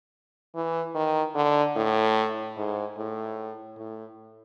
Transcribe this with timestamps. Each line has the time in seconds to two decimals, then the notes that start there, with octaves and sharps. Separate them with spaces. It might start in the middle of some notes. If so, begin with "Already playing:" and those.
0.55 E3
0.95 D#3
1.35 D3
1.76 A2
2.57 G#2
2.97 A2
3.78 A2